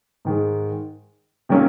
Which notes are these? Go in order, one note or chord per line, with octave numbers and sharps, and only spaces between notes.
G#2 D#3 G#3
C3 D#3 F#3 A#3 C#4